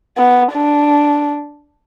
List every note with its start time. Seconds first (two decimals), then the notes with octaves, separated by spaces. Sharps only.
0.17 B3
0.53 D4